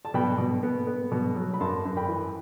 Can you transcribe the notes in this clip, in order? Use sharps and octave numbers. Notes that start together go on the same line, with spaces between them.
A5
B2 G5 B5
B2
B3
B3
B2
F#3
B5
F#2 A5 C6
F#2
G5 B5
E3